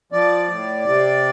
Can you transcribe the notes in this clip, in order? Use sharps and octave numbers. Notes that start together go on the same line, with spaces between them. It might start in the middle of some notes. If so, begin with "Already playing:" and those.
F3 D5
A2
C3